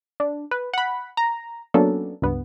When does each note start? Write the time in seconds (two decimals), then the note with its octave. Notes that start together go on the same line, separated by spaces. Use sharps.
0.20 D4
0.51 B4
0.74 F#5 B5
1.17 A#5
1.74 F#3 A#3 B3 C#4 D4 A4
2.22 C#2 G2 B3